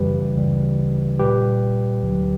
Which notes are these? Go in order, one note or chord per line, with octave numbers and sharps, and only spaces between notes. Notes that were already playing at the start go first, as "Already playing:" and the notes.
Already playing: F#2 C#3 E3 G3 G4 B4
D2 C#3 E3 G3
A#2 G3 G4 B4
D2 D3 F#3